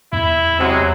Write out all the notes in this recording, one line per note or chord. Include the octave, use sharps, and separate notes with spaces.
E2 E4
C3 F#3 G#3